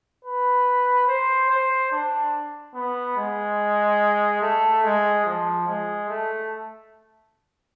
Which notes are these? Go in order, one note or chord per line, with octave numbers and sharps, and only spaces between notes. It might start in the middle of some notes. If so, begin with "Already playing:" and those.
B4
C5
C5
D4
B3
G#3
A3
G#3
F3
G#3
A3